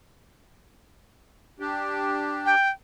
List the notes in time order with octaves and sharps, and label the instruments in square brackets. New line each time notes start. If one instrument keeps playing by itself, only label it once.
[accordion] D4 G4
[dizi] G5